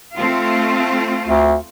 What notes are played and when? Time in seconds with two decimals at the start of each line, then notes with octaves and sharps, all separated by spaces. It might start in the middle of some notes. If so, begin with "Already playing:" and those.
0.15 A3 C4 F4
1.28 D2